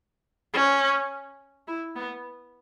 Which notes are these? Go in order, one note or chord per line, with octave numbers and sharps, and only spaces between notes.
C#4
E4
B3